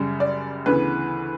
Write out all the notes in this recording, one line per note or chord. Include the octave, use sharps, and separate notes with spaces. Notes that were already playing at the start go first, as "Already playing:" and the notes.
Already playing: F#2 C#3 G3
D5
D2 C#3 E3 B3 B4